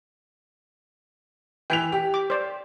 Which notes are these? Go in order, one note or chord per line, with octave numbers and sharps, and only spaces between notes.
E3 G5 B6 F7
G4
D6
C5 D5